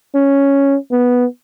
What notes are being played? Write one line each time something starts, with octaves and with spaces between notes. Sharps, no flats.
C#4
B3